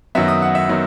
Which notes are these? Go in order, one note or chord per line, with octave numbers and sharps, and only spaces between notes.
F#2 D#3 F#3 B3 E5
D#6
F#5
E5
D#3 F#3 B3